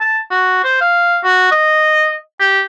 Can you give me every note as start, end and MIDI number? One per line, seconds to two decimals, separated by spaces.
0.01 0.19 81
0.31 0.60 66
0.64 0.79 72
0.81 1.19 77
1.24 1.50 66
1.52 2.14 75
2.40 2.62 67